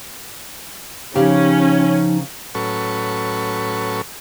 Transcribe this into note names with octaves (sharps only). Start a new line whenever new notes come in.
C#3 F3 C#4 D#4 G4
A2 F#3 C#4 A4 B4 C#6